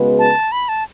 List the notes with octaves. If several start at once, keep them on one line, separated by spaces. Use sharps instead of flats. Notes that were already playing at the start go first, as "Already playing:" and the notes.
Already playing: C#3 G#3 B3 F#4 B4
A5
B5
A5